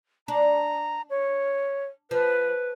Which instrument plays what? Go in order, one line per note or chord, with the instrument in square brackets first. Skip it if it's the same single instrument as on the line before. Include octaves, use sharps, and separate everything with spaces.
[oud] D4 [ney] A#5
[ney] C#5
[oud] F3 [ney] B4